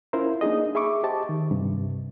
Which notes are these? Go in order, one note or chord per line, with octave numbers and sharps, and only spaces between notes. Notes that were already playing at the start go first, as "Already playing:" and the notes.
C#4 E4 F4 A#4 C5
A#3 D4 D#4 G#4 D#5
G#4 E5 B5 C#6 D6
G4 C5 D#5 A5
D#3
G2 C3